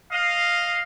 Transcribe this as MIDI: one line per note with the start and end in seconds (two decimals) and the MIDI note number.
0.12 0.83 75
0.12 0.83 77